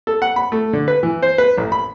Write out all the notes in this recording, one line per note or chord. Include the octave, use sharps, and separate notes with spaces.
A4
F#5
B5
A3
D3
B4
E3
C5
B4
A1
B5